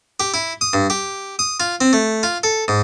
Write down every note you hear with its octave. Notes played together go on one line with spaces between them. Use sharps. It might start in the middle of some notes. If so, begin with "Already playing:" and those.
G4
E4
D#6
G2
G4
D#6
F4
C4
A3
F4
A4
G#2